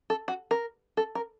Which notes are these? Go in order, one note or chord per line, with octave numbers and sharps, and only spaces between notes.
A4
F#4
A#4
A4
A#4